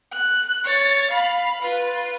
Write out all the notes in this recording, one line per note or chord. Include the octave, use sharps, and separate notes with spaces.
F#6
C#5 A6
F5 B5
F4 B4